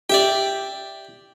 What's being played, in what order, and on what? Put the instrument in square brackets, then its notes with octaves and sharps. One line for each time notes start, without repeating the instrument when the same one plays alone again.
[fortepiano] G4 [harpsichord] D5 E5 G5